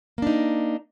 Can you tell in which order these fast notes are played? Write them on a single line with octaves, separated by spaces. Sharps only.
A#3 D4 D#4